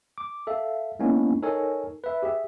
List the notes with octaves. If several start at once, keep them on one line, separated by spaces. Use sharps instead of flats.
D6
A4 E5 F5
G#3 A#3 B3 C#4 D4 E4
D#4 A4 A#4 C#5 G#5
B4 E5
G4 G#4 E5